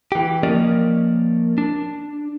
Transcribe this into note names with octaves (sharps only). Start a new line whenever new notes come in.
E3 G4
F3 A#3 C#4 A#4 D5 D#5
D4